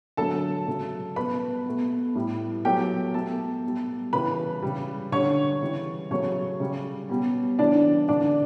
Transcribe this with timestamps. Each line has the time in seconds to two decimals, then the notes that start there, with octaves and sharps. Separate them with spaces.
0.17 D3 F#3 A3 A4 A5
0.67 C#3 F#3 A3
1.16 B2 G3 B4 B5
1.66 B2 A3
2.15 A2 G3
2.65 B2 F#3 A3 G4 G5
3.14 B2 A3 A4 A5
3.64 B2 G3
4.13 C#3 E3 G3 B4 B5
4.62 C#3 G3
5.12 D3 G3 C#5 C#6
5.62 C#3 E3 G3
6.11 C#3 F#3 A3 C#5 C#6
6.60 C#3 G3
7.10 B2 G3
7.59 C#3 E3 G3 D4 D5
8.08 D3 A3 D4 D5